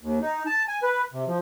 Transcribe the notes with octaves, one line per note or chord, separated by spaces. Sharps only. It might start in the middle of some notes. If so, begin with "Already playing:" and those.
D#2
D#4
A5
G#5
B4
C3
F3